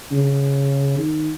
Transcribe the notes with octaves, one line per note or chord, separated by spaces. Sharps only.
C#3
D#3